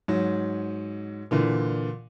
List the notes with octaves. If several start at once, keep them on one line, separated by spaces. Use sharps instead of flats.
G#2 F#3
A#2 D3 E3